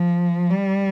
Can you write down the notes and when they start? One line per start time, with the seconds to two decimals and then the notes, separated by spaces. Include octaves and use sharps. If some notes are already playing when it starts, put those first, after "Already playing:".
Already playing: F3
0.50 G3